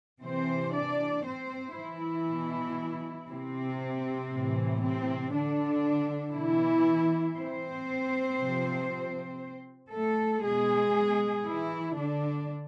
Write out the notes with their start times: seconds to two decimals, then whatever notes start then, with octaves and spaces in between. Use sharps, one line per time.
0.22 C3 E3 C4 C5
0.73 D4 D5
1.25 C4 C5
1.76 E3 E4
2.27 B2
3.29 C3 C4
4.31 A2 E3
4.82 C3 C4
5.33 D3 D4
6.35 B2 E3 E4
7.36 C4 C5
8.39 C3 F3
9.92 A3 A4
10.43 B2 G#3 G#4
11.45 E3 E4
11.96 D3 D4